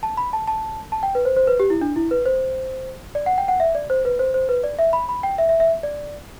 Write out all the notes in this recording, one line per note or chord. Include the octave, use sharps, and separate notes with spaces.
A5
B5
A5
A5
A5
G5
B4
C5
C5
B4
G4
E4
D4
E4
B4
C5
D5
F#5
G5
F#5
E5
D5
C5
B4
C5
C5
B4
D5
E5
B5
B5
G5
E5
E5
E5
D5